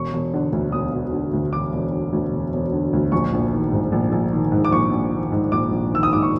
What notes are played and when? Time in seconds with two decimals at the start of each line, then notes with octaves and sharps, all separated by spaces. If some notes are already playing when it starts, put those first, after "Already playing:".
Already playing: E1 C#6
0.13 E1
0.34 D3
0.53 D2
0.72 E1 D#6
0.92 E1
1.13 D3
1.33 D2
1.53 E1 D6
1.73 E1
1.92 D3
2.13 D2
2.32 E1
2.53 E1
2.73 D3
2.93 D2
3.12 A#1 C#6
3.33 A#1
3.53 D#3
3.72 G#2
3.92 A#1
4.12 A#1
4.32 D#3
4.52 G#2
4.65 D6
4.72 A#1 C#6
4.92 A#1
5.13 D#3
5.32 G#2
5.52 A#1 D6
5.71 A#1
5.92 D#3 E6
6.03 D#6
6.12 G#2 D6
6.22 C#6